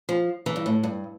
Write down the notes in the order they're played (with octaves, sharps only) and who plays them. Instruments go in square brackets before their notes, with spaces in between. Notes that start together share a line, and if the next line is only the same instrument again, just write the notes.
[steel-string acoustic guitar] F3
E3
G2
A2
G2